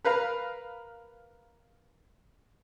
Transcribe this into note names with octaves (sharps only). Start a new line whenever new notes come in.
A#4 B4 F5 A#5